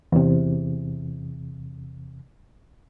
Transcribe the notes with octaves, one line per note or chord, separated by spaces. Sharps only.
E2 C3